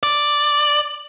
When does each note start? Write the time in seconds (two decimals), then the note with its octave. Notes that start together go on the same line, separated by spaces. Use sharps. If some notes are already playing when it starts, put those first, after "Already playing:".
0.03 D5